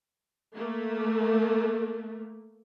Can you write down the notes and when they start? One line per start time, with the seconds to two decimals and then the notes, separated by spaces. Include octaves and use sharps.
0.55 A3 A#3